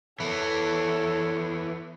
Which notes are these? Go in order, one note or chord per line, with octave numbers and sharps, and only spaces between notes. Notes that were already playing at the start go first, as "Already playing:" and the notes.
E3 B3 A4 C#5